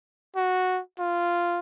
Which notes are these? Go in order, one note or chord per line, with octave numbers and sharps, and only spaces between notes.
F#4
F4